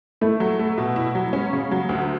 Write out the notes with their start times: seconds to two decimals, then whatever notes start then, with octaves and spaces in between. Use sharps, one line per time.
0.21 A3 E4
0.40 F#3
0.59 A3
0.78 B2
0.96 E4
1.15 F#3
1.33 G#3 C#4
1.53 C#3
1.71 F#3
1.89 D2